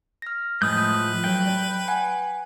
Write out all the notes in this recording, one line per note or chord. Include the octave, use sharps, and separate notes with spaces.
F6 A#6
A2 F3 G#3 B4 D#6 G6
F#3 A4 F5 G5
D5 A5
F#5 G#5